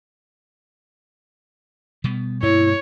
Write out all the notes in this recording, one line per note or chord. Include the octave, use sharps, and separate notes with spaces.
B2 G3 B3
G2 B2 A#3 E4 C#5